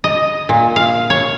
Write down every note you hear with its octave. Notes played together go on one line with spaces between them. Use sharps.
D#5
A#2
F5
C#5